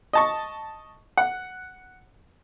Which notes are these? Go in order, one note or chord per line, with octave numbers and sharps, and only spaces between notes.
D#5 A5 C#6
F#5